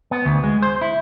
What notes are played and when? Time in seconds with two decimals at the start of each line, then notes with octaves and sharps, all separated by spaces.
0.11 B3
0.25 D2
0.44 G#3
0.62 C5
0.81 E4